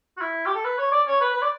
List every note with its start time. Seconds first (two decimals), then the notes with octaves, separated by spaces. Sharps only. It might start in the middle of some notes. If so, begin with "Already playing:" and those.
0.17 F#4
0.21 E4
0.46 G4
0.55 A4
0.64 B4
0.78 C#5
0.92 D5
1.07 C#5
1.21 B4
1.34 B4
1.42 D5